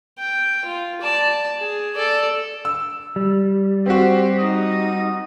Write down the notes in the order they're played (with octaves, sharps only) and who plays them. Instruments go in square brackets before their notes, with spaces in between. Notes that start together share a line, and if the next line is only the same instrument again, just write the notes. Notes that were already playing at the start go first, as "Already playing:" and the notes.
[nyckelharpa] G5
F4
D5 A5
G#4
A4 D5
[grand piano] E6
[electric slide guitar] G3
[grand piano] C4 F#4 [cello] G4 C5
[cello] D#4 [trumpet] D#6